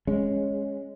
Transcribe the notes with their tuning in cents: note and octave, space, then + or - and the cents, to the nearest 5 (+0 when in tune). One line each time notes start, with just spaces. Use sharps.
G#3 +0 C#4 +0